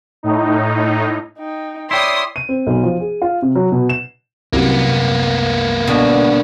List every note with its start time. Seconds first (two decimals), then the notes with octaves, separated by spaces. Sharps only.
0.23 A2 D#4
1.38 D#4 G5
1.91 E4 C#5 D5 G5 C6 D#6
2.36 D#7
2.49 C4
2.67 B1
2.84 F3
3.00 G#4
3.22 F4
3.42 C3
3.55 F#3
3.72 B2
3.89 E7
4.53 C2 F#2 A#3 B3
5.87 B2 D3